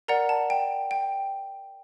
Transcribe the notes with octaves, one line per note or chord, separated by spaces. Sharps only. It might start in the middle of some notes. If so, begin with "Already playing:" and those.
A#4 D5 F#5 A#5
A5
G5
G5